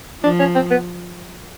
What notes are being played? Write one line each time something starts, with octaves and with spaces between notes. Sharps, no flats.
F3 D4
C#4
C4
B3